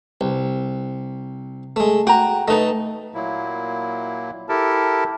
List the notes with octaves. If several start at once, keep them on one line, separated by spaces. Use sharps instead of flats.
C2
G#3 A3
F#4 G5 A#5
A3 D#4 A4 B4 D#5
A#2 F#3 A#3 E4
E4 G4 A4 A#4 A5